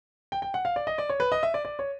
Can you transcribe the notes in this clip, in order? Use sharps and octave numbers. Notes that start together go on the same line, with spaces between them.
G5
G5
F#5
F5
D5
D#5
D5
C#5
B4
D#5
E5
D5
D5
C#5